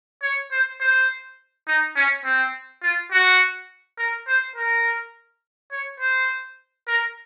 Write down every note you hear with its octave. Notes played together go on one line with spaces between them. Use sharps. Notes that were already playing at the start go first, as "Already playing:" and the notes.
C#5
C5
C5
D#4
C#4
C4
F4
F#4
A#4
C5
A#4
C#5
C5
A#4